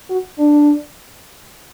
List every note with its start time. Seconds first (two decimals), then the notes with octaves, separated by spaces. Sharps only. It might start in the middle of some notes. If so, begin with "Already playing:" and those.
0.10 F#4
0.38 D4